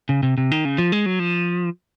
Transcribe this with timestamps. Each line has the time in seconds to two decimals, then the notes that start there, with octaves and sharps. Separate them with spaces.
0.09 C#3
0.23 C3
0.38 C3
0.51 D#3
0.65 C#3
0.78 F3
0.92 G#3
1.06 F#3
1.19 F3